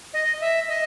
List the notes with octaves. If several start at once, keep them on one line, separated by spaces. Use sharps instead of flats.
D#5
E5
D#5